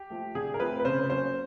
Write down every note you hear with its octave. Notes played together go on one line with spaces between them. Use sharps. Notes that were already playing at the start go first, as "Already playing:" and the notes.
Already playing: G4
F3 A3
D3 G#4
A#4
F3 A3 C4 B4
B4
C#3 C5
F#3 A#3 C#4 C5